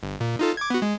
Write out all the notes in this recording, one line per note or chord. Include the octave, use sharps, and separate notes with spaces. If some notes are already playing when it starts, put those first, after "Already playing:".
G1
A#2
D#4 F4 A4
D6 G#6
B3 F#4
G#3